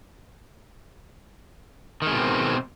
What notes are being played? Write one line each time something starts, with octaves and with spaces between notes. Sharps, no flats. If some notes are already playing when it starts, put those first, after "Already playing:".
B2 D#3 G#3 C4